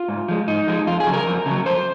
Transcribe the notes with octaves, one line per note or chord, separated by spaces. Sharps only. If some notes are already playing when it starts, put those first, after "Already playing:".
Already playing: F4
G#2
F3 G#3
G#2 D#4
F3 G#3
F2 F4
G#4
C#3 F#3
A#4
F2
C#3 F#3
F2 C5